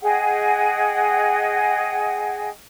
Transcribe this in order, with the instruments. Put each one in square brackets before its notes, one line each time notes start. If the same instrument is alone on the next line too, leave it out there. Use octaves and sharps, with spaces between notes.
[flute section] G#4 D#5 F#5 G5